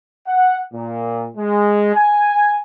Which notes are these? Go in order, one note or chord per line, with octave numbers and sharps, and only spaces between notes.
F#5
A#2
G#3
G#5